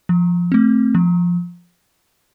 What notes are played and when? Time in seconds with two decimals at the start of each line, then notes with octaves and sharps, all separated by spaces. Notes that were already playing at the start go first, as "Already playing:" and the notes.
0.09 F3
0.52 A3 C4
0.95 F3